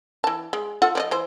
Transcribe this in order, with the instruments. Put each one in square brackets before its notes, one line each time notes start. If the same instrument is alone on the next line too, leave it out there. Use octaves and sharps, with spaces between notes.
[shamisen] E3 A5
G#3
F4 A4 F#5
F3 D5 D#5
E3 C5